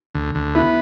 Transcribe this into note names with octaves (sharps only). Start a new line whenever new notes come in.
D2
D2
B3 E4